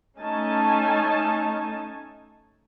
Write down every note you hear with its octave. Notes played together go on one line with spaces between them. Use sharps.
A3 C#4 D#4 G#5 A5